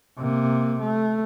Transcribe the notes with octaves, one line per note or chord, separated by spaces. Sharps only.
C3 A#3
A3